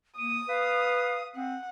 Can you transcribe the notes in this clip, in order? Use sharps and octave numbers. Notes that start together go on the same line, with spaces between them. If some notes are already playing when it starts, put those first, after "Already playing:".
A#3 D#6 D#7
B4 F5
C4 F#5